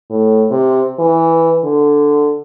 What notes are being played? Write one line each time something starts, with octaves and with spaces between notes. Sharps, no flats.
A2
C3
E3
D3